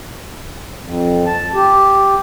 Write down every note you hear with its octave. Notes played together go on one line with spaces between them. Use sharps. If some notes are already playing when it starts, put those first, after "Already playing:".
F2
A5
G4